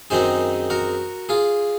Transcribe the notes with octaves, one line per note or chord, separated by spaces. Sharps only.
F#2 D#3 G#3 C4 D#4 G#4 C5
F#4 A#4
F4 G#4